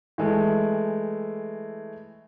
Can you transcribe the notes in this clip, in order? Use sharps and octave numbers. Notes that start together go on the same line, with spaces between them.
E3 G#3 A3